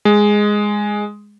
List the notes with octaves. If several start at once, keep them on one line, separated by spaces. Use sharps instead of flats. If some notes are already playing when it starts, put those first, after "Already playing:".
G#3